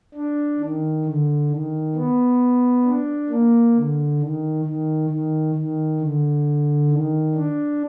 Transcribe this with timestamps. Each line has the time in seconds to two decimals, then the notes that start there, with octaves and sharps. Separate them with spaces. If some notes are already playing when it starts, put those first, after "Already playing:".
0.15 D4
0.60 D#3
1.05 D3
1.50 D#3
1.95 B3
2.85 D4
3.30 A#3
3.75 D3
4.20 D#3
4.65 D#3
5.10 D#3
5.55 D#3
6.00 D3
6.91 D#3
7.35 D4